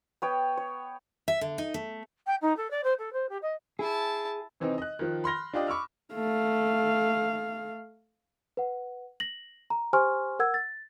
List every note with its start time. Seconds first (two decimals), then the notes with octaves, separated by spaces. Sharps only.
0.22 B3 C#5 G5
0.57 C#5
1.28 E5
1.41 D3
1.58 D#4
1.74 A3
2.26 G5
2.41 D#4
2.57 A4
2.70 D5
2.83 C5
2.98 A4
3.13 C5
3.29 G4
3.42 D#5
3.79 E4 G#4 A5
4.60 C3 E3 C4 D#4
4.78 D#5 F#6
4.99 D#3 F3
5.24 B5 C6 F6 A#6 G7
5.53 D4 F4 G4 D5 D#5
5.67 B5 C#6 D6 E6 F6
6.14 A3 F5
8.57 B4 F#5
9.20 A#6 F#7
9.70 A#5
9.93 G4 C5 G#5 C6 C#6 F6
10.39 A#4 F#5 E6 G#6
10.54 A6